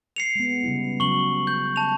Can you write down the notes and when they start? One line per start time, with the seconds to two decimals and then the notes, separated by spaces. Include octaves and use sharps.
0.16 C7 C#7 F7
0.36 G#3 B3
0.64 C#3 G3 E4
1.00 C#3 F#3 C#4 C#6 F#7
1.47 G6
1.76 A5 F7